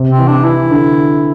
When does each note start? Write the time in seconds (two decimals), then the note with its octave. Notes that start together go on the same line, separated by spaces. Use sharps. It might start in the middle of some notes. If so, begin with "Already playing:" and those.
Already playing: C3
0.10 C4
0.18 E3
0.27 D4
0.44 E3 E4
0.71 D3